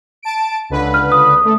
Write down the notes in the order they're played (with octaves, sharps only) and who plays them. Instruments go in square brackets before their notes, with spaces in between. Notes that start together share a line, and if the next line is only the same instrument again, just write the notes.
[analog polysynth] A5 D7
C#2 D3 B4
[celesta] F6
D#6
[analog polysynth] A3